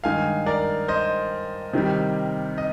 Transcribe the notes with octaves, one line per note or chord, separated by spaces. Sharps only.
G2 D#3 G#3 F5 G#5
A#4 D5
C5 D#5
C3 D#3 G3
D#5